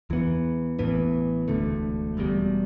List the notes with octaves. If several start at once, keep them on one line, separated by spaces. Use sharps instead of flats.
E2 E3 B3
A1 A2 E3 B3
E1 D2 D3 A3
E1 E2 B2 G3